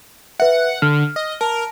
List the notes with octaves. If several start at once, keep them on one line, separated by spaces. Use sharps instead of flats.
B4 E5 F#5
D3 F6
D#5
A#4 A5